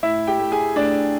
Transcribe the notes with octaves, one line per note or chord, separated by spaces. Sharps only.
A2 E4 E5
G4 G5
A3
G#4 G#5
A3 D4 D5